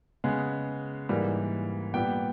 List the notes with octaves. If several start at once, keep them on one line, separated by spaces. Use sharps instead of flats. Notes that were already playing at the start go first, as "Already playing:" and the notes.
C#3 G#3 B3
G#2 E3 G3 A#3
A#2 G3 B3 G5